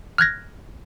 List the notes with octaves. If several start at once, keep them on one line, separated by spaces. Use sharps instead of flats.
F6 F#6 G#6 A#6